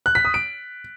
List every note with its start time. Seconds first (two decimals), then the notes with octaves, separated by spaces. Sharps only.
0.06 F#6
0.15 B6
0.25 D#6
0.34 D7